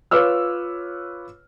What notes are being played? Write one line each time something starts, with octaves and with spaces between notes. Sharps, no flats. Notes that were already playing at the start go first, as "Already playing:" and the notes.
F4 B4 C#5 D6 E6 F6